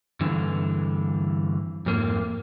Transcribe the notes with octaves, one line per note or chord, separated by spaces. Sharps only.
G2 D3 E3
F2 G#2 A#3